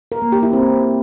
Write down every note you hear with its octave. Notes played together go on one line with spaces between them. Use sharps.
A#4
A#3
G4
E4
C4